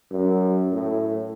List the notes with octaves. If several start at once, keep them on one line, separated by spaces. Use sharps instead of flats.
F#2
A2